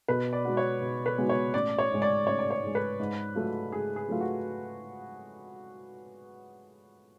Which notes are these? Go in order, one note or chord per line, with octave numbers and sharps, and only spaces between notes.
B2 B4
D5
G#3 B3 F#4
C#5
B2
B4
G#3 B3 F#4
C#5
A1 D5
C#5
G#2 G#3
D5
A1 C#5
D5
C#5
G#2 G#3
B4
G#2
F#3 A3 F4
G#2 G#4
G#4
F#3 A3 F4
F#4